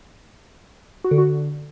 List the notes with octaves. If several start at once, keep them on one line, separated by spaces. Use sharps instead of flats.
F#4
D3
F#4
D3